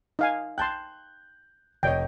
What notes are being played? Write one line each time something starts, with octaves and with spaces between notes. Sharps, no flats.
D#4 F5 G#5
G5 A5 C6 F#6 G6
F1 C#5 D#5 G5